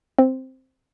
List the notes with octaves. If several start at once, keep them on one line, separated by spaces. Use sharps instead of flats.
C4